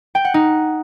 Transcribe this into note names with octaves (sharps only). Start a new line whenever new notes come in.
G5
F#5
D#4